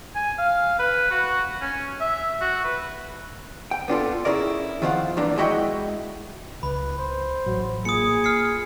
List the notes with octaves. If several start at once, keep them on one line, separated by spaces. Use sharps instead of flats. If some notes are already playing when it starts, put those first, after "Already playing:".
G#5
F5
B4
F#4
C#4
E5
F#4
B4
G5
B3 D4 F4 A4
C#4 E4 G#4 A#4 D5
D#3 F3 F4 D5 F5 F#5
E2 G#2 E3 A#3 D4
G#3 E4 F#4 D#5 E5 G5
C#2 B4 B5
C5
A1 F#3
A#2 G#4 D#6 C#7
F6 C7 C#7